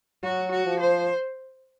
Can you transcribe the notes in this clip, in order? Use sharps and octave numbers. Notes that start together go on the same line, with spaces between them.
F#3 F#4
F#4
F3
C5